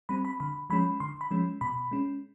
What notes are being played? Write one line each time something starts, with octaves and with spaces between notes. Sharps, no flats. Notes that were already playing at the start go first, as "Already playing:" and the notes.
G3 C4 B5
B5
D3 B5
F3 G#3 C#4 B5
D3 C6
B5
F3 G#3 C#4
B2 B5
G#3 C#4